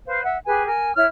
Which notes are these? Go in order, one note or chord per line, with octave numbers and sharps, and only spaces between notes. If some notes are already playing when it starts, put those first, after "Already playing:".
B4 C5 F5
E5 F#5
G4 G#4 B4 G#5
A#4 G#5
E4 C#5 F6